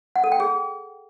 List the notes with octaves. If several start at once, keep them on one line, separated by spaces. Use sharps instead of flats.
F#5
A4
G5
G#4